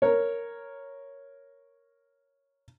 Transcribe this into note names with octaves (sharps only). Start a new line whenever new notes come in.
A#4 C#5